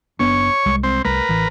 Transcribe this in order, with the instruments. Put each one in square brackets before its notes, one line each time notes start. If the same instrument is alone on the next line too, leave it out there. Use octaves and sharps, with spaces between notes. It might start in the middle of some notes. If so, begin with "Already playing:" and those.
[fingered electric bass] F#1 B3 D4 [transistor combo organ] C#5
[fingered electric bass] C2 G#3
[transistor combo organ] C4
[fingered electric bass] C2 A3 [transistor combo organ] A#4 B4
[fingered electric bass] A1 E3